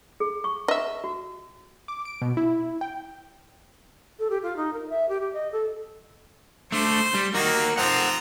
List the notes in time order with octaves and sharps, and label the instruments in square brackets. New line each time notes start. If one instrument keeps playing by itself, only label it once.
[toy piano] G#4
C#6
[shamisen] D#5 E5
[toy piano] F#4
[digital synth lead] D6
D7
B2
E4
G5
[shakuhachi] A4
G4
F4
D#4
A#4
E5
G4
G4
D#5
A4
[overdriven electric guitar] A3 D4 [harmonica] C5
[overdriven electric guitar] G3
[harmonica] D#3 F#4 [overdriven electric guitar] A#3 D#4
[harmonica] F3 C4 A#5 [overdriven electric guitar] C5 F#5